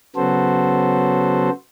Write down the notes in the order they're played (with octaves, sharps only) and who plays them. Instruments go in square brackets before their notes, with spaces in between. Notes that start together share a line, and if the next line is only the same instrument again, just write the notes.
[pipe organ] C#3 F#3 B3 F#4 A4 C5